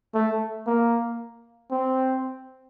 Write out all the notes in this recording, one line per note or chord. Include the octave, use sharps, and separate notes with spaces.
A3
A#3
C4